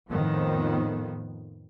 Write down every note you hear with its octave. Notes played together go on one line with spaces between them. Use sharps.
F2 A2 D#3 F3 B3